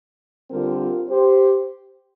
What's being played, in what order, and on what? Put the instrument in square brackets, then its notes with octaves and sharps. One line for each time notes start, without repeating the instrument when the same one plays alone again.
[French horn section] D3 G3 C4 F4 A#4
F4 A#4
G4 C5